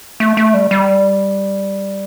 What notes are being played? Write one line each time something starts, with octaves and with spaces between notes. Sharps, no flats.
A3
A3
G3
G3